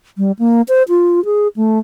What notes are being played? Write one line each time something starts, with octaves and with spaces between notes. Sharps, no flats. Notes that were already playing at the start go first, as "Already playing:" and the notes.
G3
A#3
C5
F4
G#4
A3